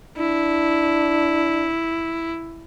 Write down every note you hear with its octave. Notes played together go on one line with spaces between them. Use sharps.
D4 E4